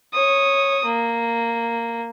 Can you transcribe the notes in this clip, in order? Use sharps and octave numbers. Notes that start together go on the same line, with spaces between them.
C#5 D#6
A#3